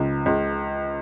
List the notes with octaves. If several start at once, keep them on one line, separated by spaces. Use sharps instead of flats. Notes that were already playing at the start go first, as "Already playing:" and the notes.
Already playing: C#2 C#3
C#2